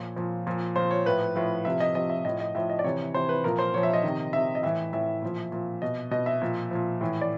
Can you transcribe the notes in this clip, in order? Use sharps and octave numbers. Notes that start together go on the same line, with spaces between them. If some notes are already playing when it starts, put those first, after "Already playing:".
Already playing: A#2 F3 C#5
A#2 F3
A#2 F3
A#2 F3 C5
C#5
A2 F3 B4
A2 F3
C3 F3 E5
D#5
C3 F3 D#5
E5
A2 F3 D#5
D#5
A2 F3 E5
D#5
D5
C3 E3 C#5
C3 E3 C5
B4
A#2 F3 A#4
C5
A#2 F3 C#5
E5
D#5
C3 D#3
C3 D#3 E5
D#5
A2 E3 E5
A2 E3 E5
A#2 F3
A#2 F3
B2 D#5
B2 D#5
E5
A#2 F3
A#2 F3
A2 E3
D5